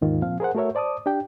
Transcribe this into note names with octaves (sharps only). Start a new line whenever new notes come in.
D#2 G#2 D#3 F4
A#2 F3 C4 F5
G#4 A#4 C5 F#5
A3 F#4 A4 A#4 C#5 E5
C5 D5 A5 D6 D#6
D4 G4 G5